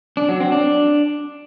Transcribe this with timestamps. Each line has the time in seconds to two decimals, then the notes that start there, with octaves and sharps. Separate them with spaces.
0.17 D4
0.29 F#3
0.40 C4
0.52 D4